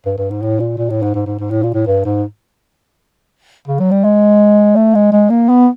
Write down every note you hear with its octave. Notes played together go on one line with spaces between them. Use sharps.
G2
G2
G#2
A2
A#2
A#2
A2
G#2
G#2
G#2
G#2
A2
A#2
A2
G2
G#2
C#3
F#3
G3
G#3
A3
G#3
G#3
A#3
B3